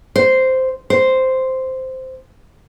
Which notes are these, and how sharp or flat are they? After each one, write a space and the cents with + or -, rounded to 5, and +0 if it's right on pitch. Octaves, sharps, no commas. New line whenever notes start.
C5 -5
C5 -5